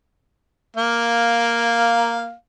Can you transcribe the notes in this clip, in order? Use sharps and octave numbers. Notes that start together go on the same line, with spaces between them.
A#3 F5